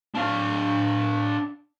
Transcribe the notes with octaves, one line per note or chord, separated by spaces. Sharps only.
D4 F5